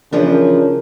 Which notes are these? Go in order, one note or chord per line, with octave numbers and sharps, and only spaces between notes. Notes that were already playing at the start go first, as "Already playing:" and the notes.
C#3 E3 F3 D4 G4 A#4